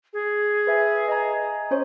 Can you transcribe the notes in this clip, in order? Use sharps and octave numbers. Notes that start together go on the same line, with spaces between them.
G#4
B4 E5 G#5
D#5 G#5 A#5
C#4 C5 C#5